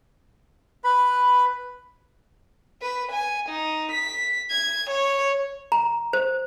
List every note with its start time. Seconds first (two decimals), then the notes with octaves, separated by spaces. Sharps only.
0.84 B4 B5
2.82 B4
3.12 G#5
3.49 D#4
3.92 B6
4.50 G#6
4.90 C#5
5.72 A#5
6.13 C5